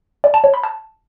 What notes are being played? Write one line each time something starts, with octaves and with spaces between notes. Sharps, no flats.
D5
A5
C#5
B5
A5